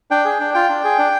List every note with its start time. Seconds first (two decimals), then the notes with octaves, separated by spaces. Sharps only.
0.11 D4 G5
0.25 G#4
0.40 D4
0.54 F4 G5
0.69 D4
0.84 G#4
0.99 D4